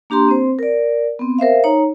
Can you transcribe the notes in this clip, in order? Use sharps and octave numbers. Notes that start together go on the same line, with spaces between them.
A#3 D4 G4 A#5 C6
C4 C5
A#4 D5
B3 C4
A#4 C5 E5 F5
D#4 C#5 A#5